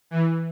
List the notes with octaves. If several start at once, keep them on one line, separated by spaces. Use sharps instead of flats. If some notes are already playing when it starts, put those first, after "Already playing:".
E3